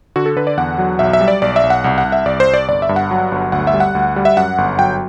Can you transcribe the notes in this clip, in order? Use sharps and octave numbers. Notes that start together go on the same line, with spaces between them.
D3 F#4
A4
D3 B4
D5
E2 F#5
F#3
B1 E5
E5
G3
D5
B1 D5
E5
B1
F#5
C2
F#5
C2
E5
C2 D5
C5
C2
D5
G1 D5
E5
G2
F#5
F#3
G1
D2 F#5
E5
G3
F#5
D2
G3
E5
F#2 F#5
G1
F#3 G5